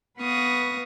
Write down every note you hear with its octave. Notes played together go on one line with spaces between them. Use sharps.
B3 B4 F5 C#6 D#6 A#6